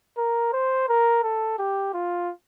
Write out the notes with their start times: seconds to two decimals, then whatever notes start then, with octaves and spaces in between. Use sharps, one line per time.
0.18 A#4
0.53 C5
0.89 A#4
1.23 A4
1.59 G4
1.94 F4